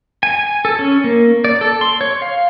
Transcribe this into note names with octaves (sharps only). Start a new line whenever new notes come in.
G#5
G#5
A4
C#4
A#3
D5
A4
C6
C#5
F5